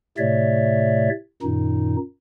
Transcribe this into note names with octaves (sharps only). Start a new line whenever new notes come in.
A2 C3 A3 C#5 D5 E5
F#2 A#2 D#3 D#4